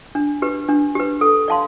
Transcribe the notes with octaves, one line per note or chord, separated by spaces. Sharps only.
D4
G4 B4
D4
G4 B4
A4
D5 F5 A5 C6